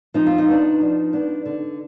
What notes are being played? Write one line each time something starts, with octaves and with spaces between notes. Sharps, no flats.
F3 D#4
F4
D#4
B3 D4
F3
B3 D4
D3